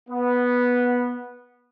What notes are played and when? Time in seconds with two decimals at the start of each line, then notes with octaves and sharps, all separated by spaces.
0.09 B3